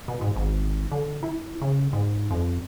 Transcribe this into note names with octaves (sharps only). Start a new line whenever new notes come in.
B2
G#2
G#1
D3
E4
C#3
G#2
F2